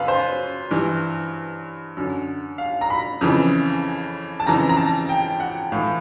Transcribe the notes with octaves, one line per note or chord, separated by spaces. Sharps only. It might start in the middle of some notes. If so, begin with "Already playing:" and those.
Already playing: F#2 C#3 B4 F5
C5
G2 E3
F#2 D3
F5
A#5
B5
F2 C#3 E3
A5
F2 C#3 E3 A#5
A#5
A5
G5
F#5
A2 E3 F5